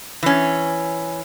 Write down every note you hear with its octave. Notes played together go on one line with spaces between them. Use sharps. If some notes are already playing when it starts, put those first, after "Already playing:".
E3 C#4